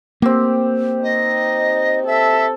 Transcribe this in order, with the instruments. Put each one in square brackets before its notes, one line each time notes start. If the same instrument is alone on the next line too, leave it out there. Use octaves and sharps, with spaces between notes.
[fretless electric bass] A#3 [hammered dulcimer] C4 G4
[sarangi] D#4 [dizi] D#5
[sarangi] A4 [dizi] E5